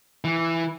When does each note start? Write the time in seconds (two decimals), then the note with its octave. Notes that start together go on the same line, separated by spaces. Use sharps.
0.24 E3